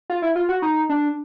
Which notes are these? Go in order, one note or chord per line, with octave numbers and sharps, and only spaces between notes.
F4
E4
F4
F#4
D#4
D4